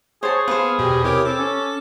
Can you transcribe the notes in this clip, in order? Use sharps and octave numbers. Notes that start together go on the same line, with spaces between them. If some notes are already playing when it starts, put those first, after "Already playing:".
G#4 C5 C#5 A5
B3 B4 C5 F5
E2 B2 G4
C3 E4 G4 A#4 C#5
C4 A4 D6
C#4